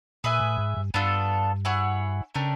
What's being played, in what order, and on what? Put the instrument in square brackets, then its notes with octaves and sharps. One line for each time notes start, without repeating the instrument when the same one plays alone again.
[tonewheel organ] A#2 [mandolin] G#4 B4 E5 G#5
[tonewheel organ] A2
G#2
G2
[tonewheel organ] G2 [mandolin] B3 D4 F4 A4
[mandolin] E4 G#4 C#5 F#5
[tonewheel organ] C#3 [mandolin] A3 D4 G4 A#4